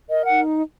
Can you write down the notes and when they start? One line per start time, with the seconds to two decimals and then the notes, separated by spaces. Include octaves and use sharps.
0.09 A#4 D#5
0.25 F#5
0.30 D#4